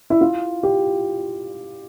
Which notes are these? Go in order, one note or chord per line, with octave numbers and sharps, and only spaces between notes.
E4
F4
G4